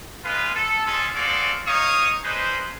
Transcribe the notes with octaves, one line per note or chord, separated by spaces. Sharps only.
G#3 F4 B4
A4
G#3 C#4 F4 G#4 A4
C4 F#4 G#4 A4 D5 F5
D#4 C#5 D#5 F5 C#6 D#6
G3 G#3 D#4 B4 C5